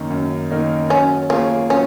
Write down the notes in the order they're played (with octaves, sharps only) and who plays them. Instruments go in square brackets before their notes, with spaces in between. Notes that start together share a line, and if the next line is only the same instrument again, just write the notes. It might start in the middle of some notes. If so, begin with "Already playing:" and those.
Already playing: [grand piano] F#2 D#3 A#3 D#4
F#2
D#3 A#3 D#4
[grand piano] F#3 [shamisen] C#4
[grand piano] A#3 F4 G#4 C#5 [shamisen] C#4
[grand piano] F#3 [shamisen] C#4